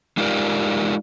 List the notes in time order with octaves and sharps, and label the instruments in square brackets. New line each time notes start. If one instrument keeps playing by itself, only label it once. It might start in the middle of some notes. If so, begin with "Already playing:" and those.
[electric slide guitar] G#3 D#4 F4 G4 A#4 D5